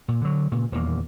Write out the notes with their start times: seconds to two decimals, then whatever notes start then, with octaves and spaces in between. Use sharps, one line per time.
0.08 A#2
0.22 D3 F#3
0.52 A#2 C#3
0.72 D#1 E2 A#3